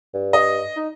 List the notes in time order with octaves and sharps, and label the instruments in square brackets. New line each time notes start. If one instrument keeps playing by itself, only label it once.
[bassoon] G2
[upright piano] D#5
[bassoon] D#4